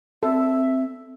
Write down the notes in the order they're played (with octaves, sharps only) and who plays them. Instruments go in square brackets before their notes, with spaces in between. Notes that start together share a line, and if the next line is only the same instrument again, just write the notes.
[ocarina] C4 [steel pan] A4 [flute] E5